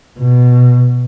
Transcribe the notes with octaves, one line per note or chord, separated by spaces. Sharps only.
B2